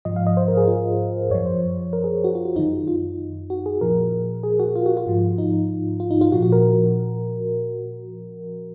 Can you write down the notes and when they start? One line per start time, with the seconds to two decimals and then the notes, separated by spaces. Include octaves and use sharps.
0.05 G#2 F3 D#5
0.16 F5
0.27 D#5
0.37 C5
0.48 A#4
0.57 G#4
0.68 F4
1.30 F#2 F3 C#5
1.46 C5
1.93 A#4
2.04 G#4
2.24 F#4
2.35 F4
2.45 F4
2.56 F#2 D#3 D#4
2.88 F4
3.50 F#4
3.66 G#4
3.81 A#2 F3 A#4
4.43 G#4
4.60 F#4
4.76 F4
4.86 F#4
4.97 F4
5.07 G#2 F3
5.38 D#4
6.00 F4
6.11 D#4
6.21 F4
6.32 A#2 F3 F#4
6.42 F#4
6.52 A#4